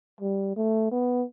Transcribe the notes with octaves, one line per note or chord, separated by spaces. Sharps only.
G3
A3
B3